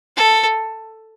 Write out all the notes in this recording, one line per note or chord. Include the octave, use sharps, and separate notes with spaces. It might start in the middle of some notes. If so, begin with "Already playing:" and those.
A4